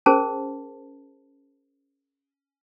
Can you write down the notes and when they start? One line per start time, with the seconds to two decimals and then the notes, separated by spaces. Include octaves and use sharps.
0.06 C#4 G#4 A#4 C5 A5